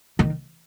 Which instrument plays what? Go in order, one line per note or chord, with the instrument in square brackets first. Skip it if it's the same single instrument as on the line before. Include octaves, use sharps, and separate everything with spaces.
[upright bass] D#3